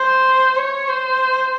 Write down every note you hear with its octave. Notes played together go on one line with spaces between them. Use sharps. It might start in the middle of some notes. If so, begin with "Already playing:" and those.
Already playing: C5
C#5
C5